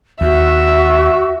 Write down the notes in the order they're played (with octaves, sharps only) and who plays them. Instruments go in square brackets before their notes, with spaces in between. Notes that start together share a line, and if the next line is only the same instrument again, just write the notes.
[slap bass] D#2 [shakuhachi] F#4 [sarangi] E5